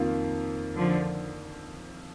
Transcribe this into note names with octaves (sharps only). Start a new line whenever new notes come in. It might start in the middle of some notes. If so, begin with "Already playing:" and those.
Already playing: F2 D#3 A#3 F4
D3 F3